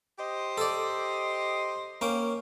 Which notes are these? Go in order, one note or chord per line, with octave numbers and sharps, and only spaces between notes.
G4 C5 D#5
A4 D5
A#3 C#4 G5